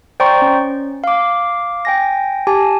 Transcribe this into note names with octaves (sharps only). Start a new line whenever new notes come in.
C5 D5 G5 A#5 C6 C#6
C#4
F5 D6
G5 G#5 A#6
G4 G#5 A5